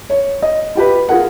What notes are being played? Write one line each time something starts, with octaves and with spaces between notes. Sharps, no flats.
C#5
D#5
F4 G4 B4
F4 G#4 A#4 F#5